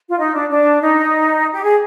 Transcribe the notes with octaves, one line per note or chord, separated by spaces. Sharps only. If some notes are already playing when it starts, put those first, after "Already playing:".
F4
D#4
D4
D4
D#4
G4
G#4